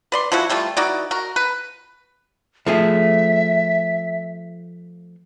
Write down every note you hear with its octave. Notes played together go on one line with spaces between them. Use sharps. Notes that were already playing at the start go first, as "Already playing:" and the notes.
B4 D5 C6
F3 G#3 E4 F#4
E3 G3 A3 F4
E3 D#4 F#4 D5
F#4 A#4
B4
F3 A3 G#4 E5